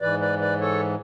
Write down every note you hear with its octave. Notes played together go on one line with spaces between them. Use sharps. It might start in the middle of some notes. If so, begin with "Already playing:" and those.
G#2 E3 B4 D5
B4 D5
B4 D5
A4 C#5